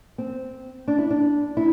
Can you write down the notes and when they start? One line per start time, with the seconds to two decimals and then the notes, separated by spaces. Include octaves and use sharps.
0.18 C4
0.88 D4
0.98 E4
1.10 D4
1.57 E4